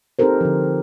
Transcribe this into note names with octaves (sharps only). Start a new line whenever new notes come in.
C4 D#4 G4 A4 A#4 C5
D3 F3